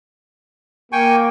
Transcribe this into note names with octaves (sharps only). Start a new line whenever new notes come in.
A#3 G5 G#5 C#6